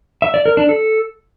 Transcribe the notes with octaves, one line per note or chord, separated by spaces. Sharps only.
E5
D5
A#4
D4
A4